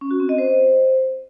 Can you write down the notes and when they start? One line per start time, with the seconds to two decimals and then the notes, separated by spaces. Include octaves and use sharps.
0.01 C#4
0.11 F#4
0.20 C4
0.29 D#5
0.38 C5